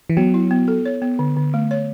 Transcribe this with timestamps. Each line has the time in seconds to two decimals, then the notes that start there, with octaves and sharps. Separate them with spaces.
0.10 E3
0.17 F#3 B3
0.34 E4
0.51 B3
0.68 A4
0.86 C#5
1.02 B3
1.19 D3
1.36 D3
1.54 A3
1.71 C#5